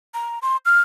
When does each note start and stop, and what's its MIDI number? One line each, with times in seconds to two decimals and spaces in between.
0.14 0.39 82
0.42 0.57 84
0.65 0.81 89